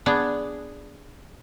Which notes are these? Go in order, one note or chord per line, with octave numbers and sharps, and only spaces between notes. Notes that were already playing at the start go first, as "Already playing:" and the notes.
B3 D4 G#4